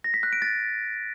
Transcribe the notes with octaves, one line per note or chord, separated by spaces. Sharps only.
A#6
B6
F#6
D7
A6